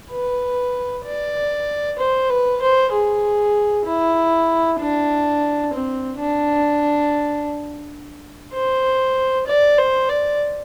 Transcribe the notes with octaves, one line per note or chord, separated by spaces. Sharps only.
B4
D5
C5
B4
C5
G#4
E4
D4
C4
D4
C5
D5
C5
D5